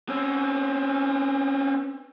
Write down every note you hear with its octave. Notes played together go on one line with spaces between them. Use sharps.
C4 C#4